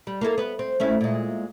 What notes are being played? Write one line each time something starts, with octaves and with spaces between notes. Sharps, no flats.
G3
A#3 E4 A4
B3 B4
C4
A3 C#4 E4
A#2 G#3